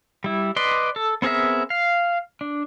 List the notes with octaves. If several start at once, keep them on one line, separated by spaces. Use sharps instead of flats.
G3 E4
B4 D5 D#5 C6
A4
B3 C4 G#4 A#4 E5
F5
D4